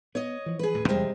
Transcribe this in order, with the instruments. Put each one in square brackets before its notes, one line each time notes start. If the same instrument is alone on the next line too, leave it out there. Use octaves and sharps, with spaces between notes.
[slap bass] B3 [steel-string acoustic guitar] C#5 D#5
[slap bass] E3 F3
[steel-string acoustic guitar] G#4 B4
[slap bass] D#1 A2
[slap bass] E2 G2 D#3 [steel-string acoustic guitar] C3 G3 G#3